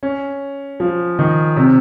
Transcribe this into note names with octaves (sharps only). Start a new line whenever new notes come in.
C#4
F3
D#3
C3